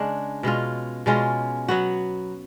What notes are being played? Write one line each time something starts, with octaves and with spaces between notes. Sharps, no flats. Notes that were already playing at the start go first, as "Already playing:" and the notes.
Already playing: C#3 G#3 D4
B2 G#3 C#4 F4
B2 G#3 C#4 F4
F#3 B3 F#4